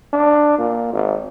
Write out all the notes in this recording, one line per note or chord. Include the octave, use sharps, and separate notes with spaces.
D4
A#2
G#1